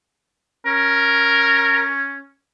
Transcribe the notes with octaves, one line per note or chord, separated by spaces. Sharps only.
C#4 A#4